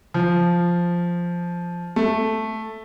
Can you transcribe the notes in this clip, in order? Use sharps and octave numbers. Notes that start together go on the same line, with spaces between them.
F3
A3